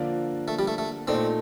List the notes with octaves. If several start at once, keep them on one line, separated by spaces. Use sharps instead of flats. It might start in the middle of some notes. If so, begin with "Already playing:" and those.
Already playing: D3 F3 A#3 D4 F4
A3
G3
A3
A3
A#2 A3 C4 D#4 A4 D5